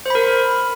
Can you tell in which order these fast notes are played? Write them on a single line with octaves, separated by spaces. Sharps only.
C5 B5 A#4